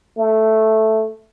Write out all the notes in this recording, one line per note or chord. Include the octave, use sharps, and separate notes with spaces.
A3